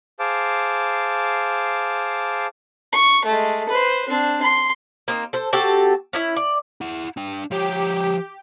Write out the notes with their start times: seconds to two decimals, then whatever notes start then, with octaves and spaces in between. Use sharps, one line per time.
0.20 G#4 C5 F5 A5 D6
2.93 C#6
3.25 G#3 A3
3.69 B4 C5
4.08 C4 D4
4.43 C6
5.08 A#3 C4 D#4
5.33 A4 C5
5.53 C4 F#4 G4 A4
6.13 C#4 E4 E5
6.36 D5
6.81 E4 F#5
7.17 D4 G5
7.51 F3 G4 C#5